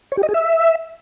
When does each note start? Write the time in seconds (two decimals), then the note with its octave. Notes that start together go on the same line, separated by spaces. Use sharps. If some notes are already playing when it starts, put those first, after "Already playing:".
0.12 C#5
0.17 G4
0.23 D#5
0.29 G#4
0.34 E5